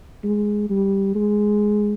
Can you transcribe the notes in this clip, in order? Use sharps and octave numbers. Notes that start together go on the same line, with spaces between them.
G#3
G3
G#3